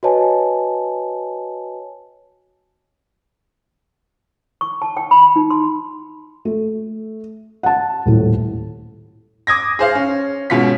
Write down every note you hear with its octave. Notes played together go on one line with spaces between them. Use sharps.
F#4 B4 C#5 D#5 G#5 A5
C#6
A5
G5
B5
D#4
C6
A3
F#5 A5
D#1 A2
D6 D#6 G#6 A#6
G#4 C5 F5
C#4
G#2 B2 C#4 F4 F#5 B6